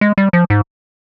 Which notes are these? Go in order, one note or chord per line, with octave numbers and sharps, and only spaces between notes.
G#3
G3
F3
G#2